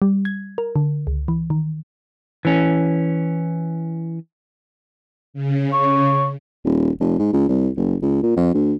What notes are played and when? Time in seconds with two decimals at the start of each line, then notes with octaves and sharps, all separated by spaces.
0.02 G3
0.25 G#6
0.58 A#4
0.76 D3
1.07 C#2
1.28 E3
1.50 D#3
2.45 E3 C#4
5.34 C#3
5.72 C#5
6.65 D#1
7.00 F1
7.19 G#2
7.33 C#2
7.49 C2
7.77 F#1
8.02 C#2
8.23 A#2
8.37 F2
8.54 D2